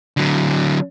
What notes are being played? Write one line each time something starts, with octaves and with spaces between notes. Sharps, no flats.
D3 F#3